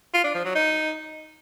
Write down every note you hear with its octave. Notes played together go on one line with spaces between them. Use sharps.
F4
D4
F3
F#3
D#4